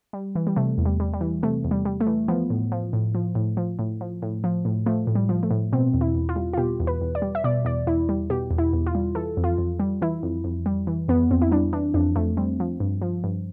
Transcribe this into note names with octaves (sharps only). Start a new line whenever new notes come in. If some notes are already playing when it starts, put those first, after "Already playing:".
G3
E3
G3
C3 A3
E2
G3
G3
G3
E3
C3 A3
E2
G3
G3
A3
E3
F3 B3
A2
F3
A2
F3
A2
F3
A2
F3
A2
F3
A2
F3 A3
A2
G3
F3
A3
A2
B2 C4
E2
E4
E2
F4
G3
F4
B2 G4
E2
B4
E2
D5
G3
E5
B2 D5
E2 D5
E2 E4
G3
B2 G4
E2
E4
E2
F4
G3
E3 A4
F2
F4
F2
G3
E3 E4
F2
F2
G3
E3
F2 B3
F2 C4
E4
G3 D4
E3 D4
F2 D4
F2 A3
G3 C4
F3
G2
F3
G2